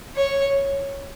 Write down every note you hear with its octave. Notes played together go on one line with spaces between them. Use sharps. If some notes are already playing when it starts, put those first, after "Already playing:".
C#5